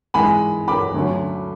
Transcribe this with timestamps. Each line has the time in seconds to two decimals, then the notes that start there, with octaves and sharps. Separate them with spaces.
0.14 G#2 E3 G#3 G#5 B5
0.68 B5 D6
0.94 D2 D3 F#3 C#4